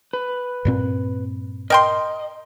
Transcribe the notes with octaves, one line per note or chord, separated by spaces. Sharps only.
B4
G2 A#2 C4
A#4 D#5 G5 C6